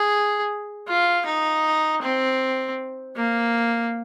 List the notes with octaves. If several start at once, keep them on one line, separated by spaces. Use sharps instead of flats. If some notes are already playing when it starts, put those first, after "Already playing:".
Already playing: G#4
F4
D#4
C4
A#3